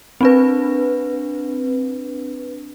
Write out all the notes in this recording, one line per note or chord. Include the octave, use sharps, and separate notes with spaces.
C4 D4 B4